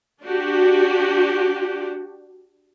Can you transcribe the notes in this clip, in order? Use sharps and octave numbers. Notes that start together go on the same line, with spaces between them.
D4 F#4 G4